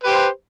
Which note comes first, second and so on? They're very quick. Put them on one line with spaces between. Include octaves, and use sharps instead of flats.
B4 G4 C5